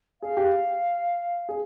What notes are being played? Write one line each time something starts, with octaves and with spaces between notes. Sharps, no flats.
G#4 F5
G4
G#4